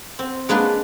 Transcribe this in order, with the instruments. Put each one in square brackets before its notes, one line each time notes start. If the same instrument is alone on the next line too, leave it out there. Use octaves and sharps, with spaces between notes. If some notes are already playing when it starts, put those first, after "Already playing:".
[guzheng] C4
G#3 A#3 D4 B4 C6